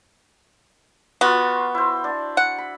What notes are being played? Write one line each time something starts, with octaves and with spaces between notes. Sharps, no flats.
B3 F4 F#4
E4 C5
D4
F#5
B5